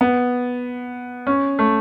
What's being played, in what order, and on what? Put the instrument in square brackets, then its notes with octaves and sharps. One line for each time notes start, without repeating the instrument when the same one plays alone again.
[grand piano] B3
C#4
A3